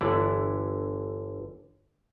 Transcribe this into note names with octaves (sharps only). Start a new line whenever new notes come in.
G1 D3 E3 E4 D5